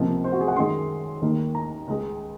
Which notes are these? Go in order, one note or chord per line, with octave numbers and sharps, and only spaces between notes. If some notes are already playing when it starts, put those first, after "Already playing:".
Already playing: C#2 C3 F3 A#3
C5
F#4
G#4
F#5
F#2 D#3 G#3 C6
D#2 D#3 A#3
A#5
C#2 C#3 G#3